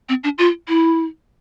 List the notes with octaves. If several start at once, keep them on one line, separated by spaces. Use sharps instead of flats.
C4
D4
F4
E4